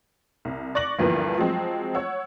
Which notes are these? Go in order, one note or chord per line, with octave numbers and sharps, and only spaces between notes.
C2
D5 C#6 D6 F#6 A#6 F#7
D2 G2 E3 F3 A#3 B3
F3 F#3 G#3 C4
C#5 F#5 E6